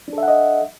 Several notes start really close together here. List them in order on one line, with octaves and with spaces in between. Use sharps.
D4 A4 E5 F#5 D#5